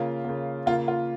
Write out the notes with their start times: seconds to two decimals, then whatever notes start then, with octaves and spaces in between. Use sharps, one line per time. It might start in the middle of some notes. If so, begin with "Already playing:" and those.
Already playing: C#3 A#3 F4
0.25 C#3 A#3
0.66 C#3 A#3 F4
0.88 F4